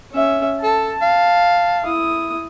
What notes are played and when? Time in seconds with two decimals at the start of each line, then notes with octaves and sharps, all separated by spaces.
0.13 C#4 E5
0.63 A4 A5
1.02 F5
1.83 E4 D#6